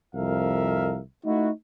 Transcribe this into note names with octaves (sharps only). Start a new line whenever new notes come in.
C2 F2 A#4 E5 F5
A3 D#4 E4 F#4